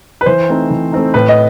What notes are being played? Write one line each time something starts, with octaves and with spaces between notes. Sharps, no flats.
B4
E3 C5
A3 C4 D#4
E3
A3 C4 D#4
A2 B4
D#5